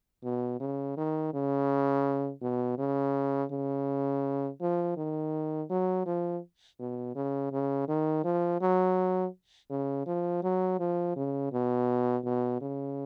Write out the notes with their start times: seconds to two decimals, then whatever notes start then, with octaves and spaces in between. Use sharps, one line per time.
0.24 B2
0.60 C#3
0.97 D#3
1.33 C#3
2.42 B2
2.78 C#3
3.51 C#3
4.61 F3
4.97 D#3
5.70 F#3
6.06 F3
6.79 B2
7.16 C#3
7.52 C#3
7.88 D#3
8.24 F3
8.61 F#3
9.70 C#3
10.06 F3
10.43 F#3
10.79 F3
11.16 C#3
11.53 B2
12.25 B2
12.62 C#3